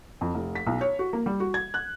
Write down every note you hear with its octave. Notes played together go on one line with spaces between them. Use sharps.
F2
F1
B6
B1
C#5
F#4
A#3
G3
F#4
G#6
F#6